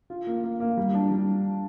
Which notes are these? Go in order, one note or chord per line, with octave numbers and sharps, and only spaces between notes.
F4
A#3
A#3
A#3
G3
D4
G3